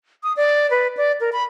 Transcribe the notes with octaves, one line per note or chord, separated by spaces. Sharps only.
D#6
D5
B4
D5
A#4
B5